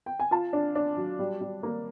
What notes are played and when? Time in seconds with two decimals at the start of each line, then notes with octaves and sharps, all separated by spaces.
0.06 G5
0.20 G#5
0.31 F4 A5
0.53 D4
0.75 D4
0.97 F#3
1.19 G3
1.41 G3
1.63 A#3